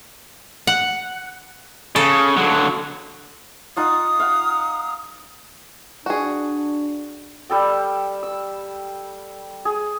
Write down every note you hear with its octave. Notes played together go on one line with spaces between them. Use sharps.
F#5
C#3 A4
D3 F#3
D#4 F4 F#5 D#6
F5 F#5
D4 F#4 G#4
G3 A4 G5
E6
G#4